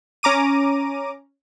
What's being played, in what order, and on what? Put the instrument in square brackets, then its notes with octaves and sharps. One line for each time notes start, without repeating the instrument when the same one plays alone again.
[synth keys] C#4 A#5 D6 D#7